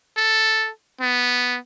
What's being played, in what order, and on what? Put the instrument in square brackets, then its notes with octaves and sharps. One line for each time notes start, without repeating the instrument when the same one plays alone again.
[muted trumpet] A4
B3